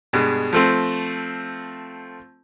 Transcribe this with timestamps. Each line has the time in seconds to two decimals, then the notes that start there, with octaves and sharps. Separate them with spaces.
0.13 G2 B2 G#3
0.53 F3 A3 C4